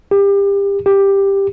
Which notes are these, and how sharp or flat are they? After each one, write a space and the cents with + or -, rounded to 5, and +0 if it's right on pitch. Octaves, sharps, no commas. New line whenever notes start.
G4 +30
G4 +10